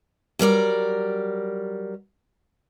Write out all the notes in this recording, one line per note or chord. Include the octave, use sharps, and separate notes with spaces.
F#3 G3 A#4 D5